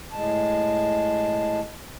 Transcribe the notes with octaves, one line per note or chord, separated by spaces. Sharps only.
A2 G#3 A5